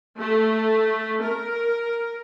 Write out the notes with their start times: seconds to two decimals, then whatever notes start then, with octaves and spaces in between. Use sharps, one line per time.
0.18 A3
1.22 A#4